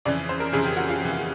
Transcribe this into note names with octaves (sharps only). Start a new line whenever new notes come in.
F2 C#3 E3 D5
C5
A#4
F2 C#3 E3 G#4
G4
F#4
F4
F2 C#3 E3
F4